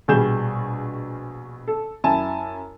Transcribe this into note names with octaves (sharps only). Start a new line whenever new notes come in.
A#1 B2 G3 G#4 G6 E7
A4
F#2 E4 G#5 A5